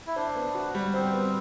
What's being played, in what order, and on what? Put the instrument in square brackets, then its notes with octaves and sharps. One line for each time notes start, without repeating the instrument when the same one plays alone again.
[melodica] E4
[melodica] D4 [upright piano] C5
[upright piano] B3
F#4
G3
[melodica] C4 [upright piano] C5
[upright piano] B3